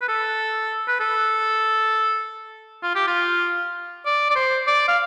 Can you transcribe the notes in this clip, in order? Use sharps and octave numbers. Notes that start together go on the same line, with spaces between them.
B4
A4
B4
A4
F4
G4
F4
D5
D5
C5
D5
F5